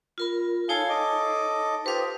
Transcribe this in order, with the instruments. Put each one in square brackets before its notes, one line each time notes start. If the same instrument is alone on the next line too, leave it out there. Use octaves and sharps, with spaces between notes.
[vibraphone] F4 A#4 B5
[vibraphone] D#4 C#5 A5 [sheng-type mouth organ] A4 F5 G#5
[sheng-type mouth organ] A4 D#5 D6
[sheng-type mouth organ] F4 G4 C5 [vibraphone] B4 F5 D#6